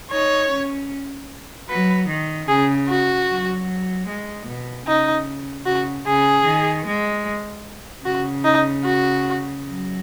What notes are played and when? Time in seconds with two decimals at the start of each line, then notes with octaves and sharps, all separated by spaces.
0.11 D#4 C#5
0.50 C#4
1.69 F#3 B4
2.09 D#3
2.49 C#3 G#4
2.89 F#4
3.29 F#3
4.08 G#3
4.47 B2
4.87 C#3 D#4
5.66 C#3 F#4
6.07 C#3 G#4
6.46 D#3
6.86 G#3
8.05 C#3 F#4
8.44 D#4
8.85 F#4
9.64 F#3